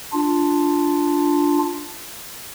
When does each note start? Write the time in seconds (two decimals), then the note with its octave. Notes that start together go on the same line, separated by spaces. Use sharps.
0.13 D4 F4